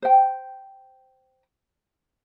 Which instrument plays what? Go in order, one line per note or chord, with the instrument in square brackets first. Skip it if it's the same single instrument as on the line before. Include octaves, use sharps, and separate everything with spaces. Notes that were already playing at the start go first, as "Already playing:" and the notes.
[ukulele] C5 G5